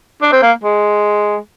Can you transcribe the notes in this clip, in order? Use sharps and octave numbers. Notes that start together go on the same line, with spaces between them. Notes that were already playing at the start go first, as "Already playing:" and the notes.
D4
C4
A#3
G#3